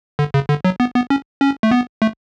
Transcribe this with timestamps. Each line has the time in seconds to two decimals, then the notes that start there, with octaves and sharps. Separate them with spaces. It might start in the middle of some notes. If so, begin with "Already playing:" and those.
0.19 D3
0.34 C#3
0.49 D3
0.65 F#3
0.80 B3
0.95 B3
1.10 C#4
1.41 C#4
1.63 A3
1.71 B3
2.02 A3